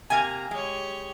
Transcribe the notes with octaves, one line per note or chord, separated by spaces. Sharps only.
C3 A#3 G#5 A#5 G#6
G#3 G4 C#5